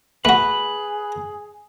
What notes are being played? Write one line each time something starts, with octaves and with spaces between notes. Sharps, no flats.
A3 F#4 G#4 B4